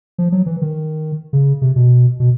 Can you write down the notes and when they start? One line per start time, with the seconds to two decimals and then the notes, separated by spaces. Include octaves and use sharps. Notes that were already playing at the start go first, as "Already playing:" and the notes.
0.18 F3
0.32 F#3
0.46 E3
0.62 D#3
1.33 C#3
1.62 C3
1.76 B2
2.20 B2